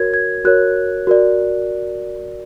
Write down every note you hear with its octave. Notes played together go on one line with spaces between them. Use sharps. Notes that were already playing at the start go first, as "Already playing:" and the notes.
Already playing: F#4 A#4 C#5 G#6
G#6
F#4 A#4 C#5 F#6
F#4 A#4 D5